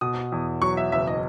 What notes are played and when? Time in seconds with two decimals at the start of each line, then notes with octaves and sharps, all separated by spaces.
0.01 B2 D#6
0.32 E2
0.62 F#3 C#6
0.77 E5
0.92 F#1 E5
1.07 D#5